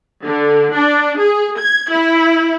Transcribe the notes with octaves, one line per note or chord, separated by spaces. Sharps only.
D3
D4
G#4
G#6
E4